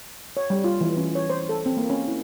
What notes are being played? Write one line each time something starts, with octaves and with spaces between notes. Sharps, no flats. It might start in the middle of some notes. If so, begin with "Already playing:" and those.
C#5
G3
F4
E3
C#4
C#5
C5
A4
C4
A#3
C#4
E4